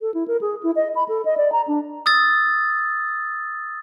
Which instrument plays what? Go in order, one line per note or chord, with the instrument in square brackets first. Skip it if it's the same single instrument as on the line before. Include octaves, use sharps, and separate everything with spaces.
[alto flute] A4
E4
A#4
G#4
E4
D#5
B5
A4
D#5
D5
A#5
D4
[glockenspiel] D#6 E6 A6